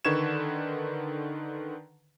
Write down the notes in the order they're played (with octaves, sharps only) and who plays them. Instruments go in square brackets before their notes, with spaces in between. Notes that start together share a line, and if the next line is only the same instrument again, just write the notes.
[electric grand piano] D3 D#3 B4 C#6 G#6 E7